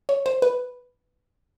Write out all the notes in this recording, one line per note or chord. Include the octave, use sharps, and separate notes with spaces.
C#5
C5
B4